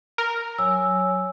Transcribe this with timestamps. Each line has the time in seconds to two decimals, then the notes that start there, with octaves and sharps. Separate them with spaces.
0.18 A#4
0.58 F#3 C#5 G#5 E6